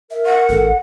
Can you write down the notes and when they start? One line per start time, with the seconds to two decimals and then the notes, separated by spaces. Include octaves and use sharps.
0.11 A#4 E5
0.26 F#5
0.49 A1 A4